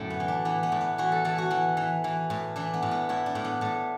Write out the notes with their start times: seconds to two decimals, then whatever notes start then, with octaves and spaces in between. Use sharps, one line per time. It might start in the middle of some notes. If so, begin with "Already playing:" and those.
Already playing: F#2 A2 D3 A3
0.10 B3
0.20 E3
0.28 D4
0.45 E3 B3
0.63 B3
0.72 A2
0.81 B3
0.98 E3 F#4
1.12 A4
1.25 E3 A4
1.38 F#4
1.50 E3 E4
1.77 E3
2.04 E3
2.30 A2
2.56 E3 D4
2.74 B3
2.82 A2
2.91 B3
3.09 A2 E4
3.26 D4
3.35 A2
3.44 B3
3.61 A2 A3